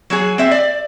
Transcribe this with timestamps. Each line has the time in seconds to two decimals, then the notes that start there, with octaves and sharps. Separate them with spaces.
0.10 F#3 F#4 G#4
0.38 C4 E5
0.51 D5